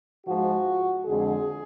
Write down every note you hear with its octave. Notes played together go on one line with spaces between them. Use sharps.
G#2 F3 G#3 F#4
F2 D3 G#3 G#4